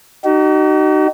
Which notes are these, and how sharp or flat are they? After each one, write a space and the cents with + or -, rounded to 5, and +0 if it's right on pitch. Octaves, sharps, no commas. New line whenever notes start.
D#4 -20 F#4 +45